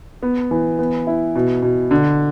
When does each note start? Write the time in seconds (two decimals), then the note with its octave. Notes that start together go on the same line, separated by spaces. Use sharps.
0.23 B3
0.51 E3
0.79 B3
1.07 E4
1.36 B2
1.63 B2
1.91 D3